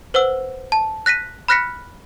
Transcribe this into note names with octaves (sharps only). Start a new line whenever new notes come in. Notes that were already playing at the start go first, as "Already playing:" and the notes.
B4 C5 F#5 E6
A5
F#6 A#6 B6 D#7
B5 F6 F#6 A#6 B6 C#7